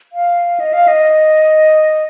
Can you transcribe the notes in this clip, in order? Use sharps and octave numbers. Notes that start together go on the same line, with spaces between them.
F5
D#5
F5
D#5